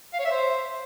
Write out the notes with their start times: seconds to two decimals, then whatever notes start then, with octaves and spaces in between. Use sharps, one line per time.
0.13 F5
0.19 C#5
0.25 E5
0.31 C5